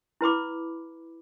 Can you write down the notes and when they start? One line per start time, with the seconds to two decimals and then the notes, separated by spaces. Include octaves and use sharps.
0.21 E4 B4 B5 D6